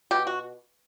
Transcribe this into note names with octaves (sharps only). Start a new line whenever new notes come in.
B2 G4
F#4